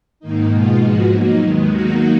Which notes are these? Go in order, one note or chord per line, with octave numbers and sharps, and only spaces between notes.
G#2 D#3 A#3 D#4
B2 G#3 B3 F4
G#2 F3 B3 F#4
F#3 A#3 D#4
D#2 D#3 G#3 B3
D#3 F#3 A#3 D#4 F#4